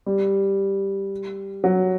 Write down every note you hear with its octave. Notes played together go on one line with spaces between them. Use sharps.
G3
F#3